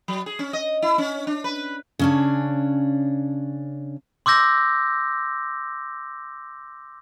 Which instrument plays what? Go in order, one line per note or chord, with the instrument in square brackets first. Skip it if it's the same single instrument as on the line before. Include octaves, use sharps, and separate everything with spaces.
[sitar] F#3
G#4
C#4
D#5
E4
C#4
D4
B4
[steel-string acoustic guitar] C#3 C#4 D4
[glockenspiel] C6 D6 E6 G6 A#6